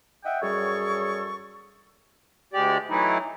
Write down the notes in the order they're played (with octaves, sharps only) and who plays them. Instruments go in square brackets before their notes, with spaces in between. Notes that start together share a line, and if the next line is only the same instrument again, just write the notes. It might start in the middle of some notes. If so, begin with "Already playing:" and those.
[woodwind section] D#5 E5 F#5 G5
F#2 G3 G#4 A4 C#5 C#6
[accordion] D2 G#3 G4 D5
E3 F#3 A3 D#4 E4